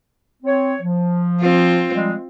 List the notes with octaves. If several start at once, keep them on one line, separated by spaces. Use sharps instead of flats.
C4 C#5
F3
C4 F4
F3 G3 G#3